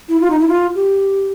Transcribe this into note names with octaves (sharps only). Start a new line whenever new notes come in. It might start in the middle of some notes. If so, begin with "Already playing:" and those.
E4
F4
D#4
E4
F4
G4